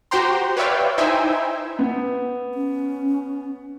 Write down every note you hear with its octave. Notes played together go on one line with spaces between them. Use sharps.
F#4 G4 C5 G5 A#5 C6
B4 C#5 D5 E5 F5 G5
D#4 E4 C5 E5 G5 G#5
B3
C#4